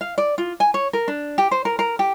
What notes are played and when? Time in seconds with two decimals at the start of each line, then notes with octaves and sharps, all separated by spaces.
0.01 F5
0.18 D5
0.38 F4
0.60 G#5
0.74 C#5
0.93 A#4
1.08 D4
1.38 G4
1.51 C5
1.65 A#4
1.79 A#4
1.99 G4